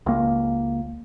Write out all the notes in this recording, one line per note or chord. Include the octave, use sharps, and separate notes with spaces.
C#2 A#3